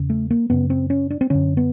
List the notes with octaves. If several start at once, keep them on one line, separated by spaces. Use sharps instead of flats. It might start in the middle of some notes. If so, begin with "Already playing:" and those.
Already playing: E2 C#3
A3
A#3
F#2 C#3 B3
C4
C#4
D4
C4
F#2 D3 C#4
B3